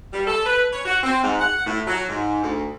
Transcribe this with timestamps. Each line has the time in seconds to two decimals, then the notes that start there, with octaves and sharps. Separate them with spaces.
0.13 G3
0.27 A4
0.45 B4
0.73 C#5
0.85 F#4
1.03 C4
1.23 G#2
1.40 F#5
1.66 A2
1.87 F#3
2.09 G#2
2.43 D2